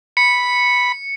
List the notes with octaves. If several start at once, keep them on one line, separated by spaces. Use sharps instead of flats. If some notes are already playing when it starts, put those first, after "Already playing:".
B5 C#7